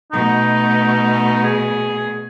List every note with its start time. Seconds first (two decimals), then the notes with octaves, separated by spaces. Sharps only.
0.12 B2 A3 D#4
1.44 G#4